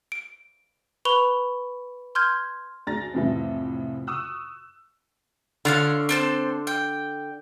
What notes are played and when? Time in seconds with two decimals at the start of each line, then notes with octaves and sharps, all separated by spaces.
0.12 D7
1.05 B4 B5 C#6 F7 G7
2.15 C6 F6 G6 G#6
2.87 D2 D4 G#4 A#5 A6 A#6
3.14 F2 A2 C3 E3 G3 E4
4.07 C#6 D#6 E6 F#6
5.65 D3 F4 C#5 F5
6.09 C4 A4 C5
6.67 G5